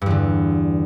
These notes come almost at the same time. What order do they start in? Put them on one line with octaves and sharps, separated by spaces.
G2 E2 D3